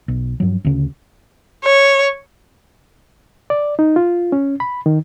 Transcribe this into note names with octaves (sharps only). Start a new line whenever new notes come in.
B1
G2 F3 F#3
D2 C#3
C#5
D5
D#4
F4
C#4
B5
D#3